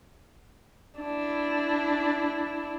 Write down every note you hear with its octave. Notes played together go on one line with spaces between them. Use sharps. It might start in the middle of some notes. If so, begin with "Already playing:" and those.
D4 E4